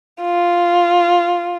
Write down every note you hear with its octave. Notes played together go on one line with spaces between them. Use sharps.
F4